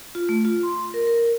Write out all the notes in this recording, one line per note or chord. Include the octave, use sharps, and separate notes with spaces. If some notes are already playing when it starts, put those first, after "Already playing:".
F4
A3
F4
C6
A#4
A#4